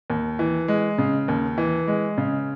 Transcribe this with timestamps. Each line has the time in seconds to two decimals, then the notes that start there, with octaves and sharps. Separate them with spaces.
0.10 D#2
0.39 E3
0.68 G#3
0.98 C#3
1.28 D#2
1.58 E3
1.88 G#3
2.18 C#3